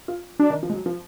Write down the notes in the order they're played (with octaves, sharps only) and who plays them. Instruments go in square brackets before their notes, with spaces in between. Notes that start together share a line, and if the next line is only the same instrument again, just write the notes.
[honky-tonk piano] F4
[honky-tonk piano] F#3 [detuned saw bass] D4
[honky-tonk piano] D#3
F3
G#3
F#3
F3